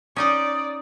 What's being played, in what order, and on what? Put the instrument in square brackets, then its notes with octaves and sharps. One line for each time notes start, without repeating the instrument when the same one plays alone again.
[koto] C#4 D#4 D#5 [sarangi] D5 [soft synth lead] D#6